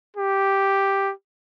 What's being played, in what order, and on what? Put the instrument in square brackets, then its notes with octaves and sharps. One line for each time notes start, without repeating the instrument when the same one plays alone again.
[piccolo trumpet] G4